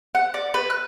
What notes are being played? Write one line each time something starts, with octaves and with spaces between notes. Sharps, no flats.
F#5
D5
B4
F#6